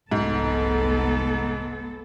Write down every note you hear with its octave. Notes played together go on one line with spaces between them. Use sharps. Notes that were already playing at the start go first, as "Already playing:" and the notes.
F1 C2 G#2 B3 A4